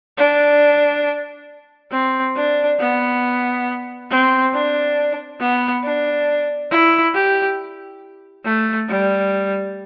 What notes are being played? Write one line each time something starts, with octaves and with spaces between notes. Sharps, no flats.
D4
C4
D4
B3
C4
D4
B3
D4
E4
G4
A3
G3